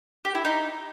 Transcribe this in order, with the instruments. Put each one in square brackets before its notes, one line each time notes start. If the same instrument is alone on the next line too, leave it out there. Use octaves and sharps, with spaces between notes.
[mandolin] G4
E4
D#4